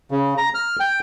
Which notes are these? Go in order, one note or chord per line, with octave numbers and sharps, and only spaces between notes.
C#3
A#5
F6
G5